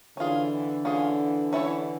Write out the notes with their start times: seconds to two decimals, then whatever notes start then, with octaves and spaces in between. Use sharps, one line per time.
0.17 D3 E3 C#4 F4 G#4
0.85 C#4 F4 G#4
1.53 C#4 E4 A4 C#5